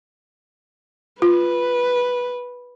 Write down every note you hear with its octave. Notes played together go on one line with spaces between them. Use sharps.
F4 B4